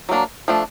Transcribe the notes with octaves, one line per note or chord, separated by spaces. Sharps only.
F#3 A#3 D4
F3 A3 D4